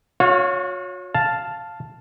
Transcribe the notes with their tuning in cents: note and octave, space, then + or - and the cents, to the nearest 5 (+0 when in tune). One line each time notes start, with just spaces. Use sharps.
F#4 -40 C#5 +0 F5 +0
F5 +0 A5 +0